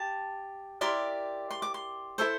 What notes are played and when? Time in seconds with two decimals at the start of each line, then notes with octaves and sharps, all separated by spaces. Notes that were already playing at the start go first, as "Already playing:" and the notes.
Already playing: G4 A5
0.81 E4 G4 A#4 D5 C6
1.51 C6
1.62 D6
1.74 C6
2.18 E4 A4 C5